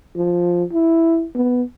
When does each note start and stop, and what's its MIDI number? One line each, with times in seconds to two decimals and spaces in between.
0.16 0.64 53
0.73 1.26 64
1.35 1.63 59